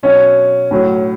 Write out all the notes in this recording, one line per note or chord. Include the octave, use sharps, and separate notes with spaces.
B2 F#3 C#4
A2 F#3